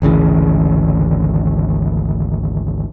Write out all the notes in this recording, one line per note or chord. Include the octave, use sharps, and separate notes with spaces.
G#1 D2 C#3 E3